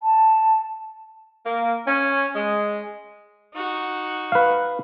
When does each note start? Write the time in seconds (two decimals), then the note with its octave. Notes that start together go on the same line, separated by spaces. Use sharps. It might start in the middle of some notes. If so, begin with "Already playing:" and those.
0.03 A5
1.46 A#3
1.87 C#4
2.35 G#3
3.54 D#4 F#4
4.32 B4 F5